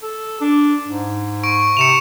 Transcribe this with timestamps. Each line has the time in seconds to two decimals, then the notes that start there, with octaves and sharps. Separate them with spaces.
0.02 A4
0.41 D4
0.88 G#2
1.43 C#6 D7
1.77 C3 C#7 E7 F7